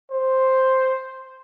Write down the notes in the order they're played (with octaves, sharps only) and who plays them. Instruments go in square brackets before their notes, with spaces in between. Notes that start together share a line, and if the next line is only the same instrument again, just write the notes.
[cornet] C5